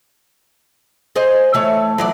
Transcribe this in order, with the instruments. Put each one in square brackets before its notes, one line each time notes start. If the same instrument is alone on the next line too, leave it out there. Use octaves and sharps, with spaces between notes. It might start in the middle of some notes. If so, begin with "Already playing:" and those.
[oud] G#4 C5 D#5
E3 A3 C#5
E3 F#3 D5